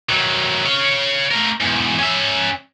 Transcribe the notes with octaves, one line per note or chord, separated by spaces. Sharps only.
D#3 F#3
C#5 F5
A3 A#4
E2 G#2
C#4 E5